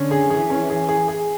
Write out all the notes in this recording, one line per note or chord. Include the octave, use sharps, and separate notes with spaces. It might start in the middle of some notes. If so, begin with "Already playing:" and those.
Already playing: D3 C#4
G#4
E3 G#4
C#4
G#4
G#4
G#4